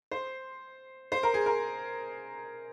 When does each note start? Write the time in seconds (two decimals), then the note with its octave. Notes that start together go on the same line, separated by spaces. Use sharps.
0.11 C5
1.12 C5
1.23 A#4
1.34 G#4
1.46 A#4